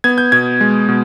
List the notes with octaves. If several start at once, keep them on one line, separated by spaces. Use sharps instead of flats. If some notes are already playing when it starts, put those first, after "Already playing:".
B3 G#6
G6
B2 G#6
G#3
B2